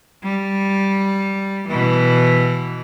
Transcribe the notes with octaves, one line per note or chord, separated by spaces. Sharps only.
G3
B2 E3